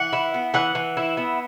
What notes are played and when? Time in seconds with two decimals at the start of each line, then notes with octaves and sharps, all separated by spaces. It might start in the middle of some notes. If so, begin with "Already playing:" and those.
Already playing: E3 F#5
0.13 E4
0.34 B3
0.54 E3 F#5
0.75 E3
0.97 E4
1.17 B3